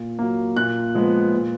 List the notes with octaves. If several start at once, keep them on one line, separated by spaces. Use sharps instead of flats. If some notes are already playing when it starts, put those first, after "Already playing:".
Already playing: A#2
F#3 A#3
A#2 F#6
F3 G#3 B3
A#2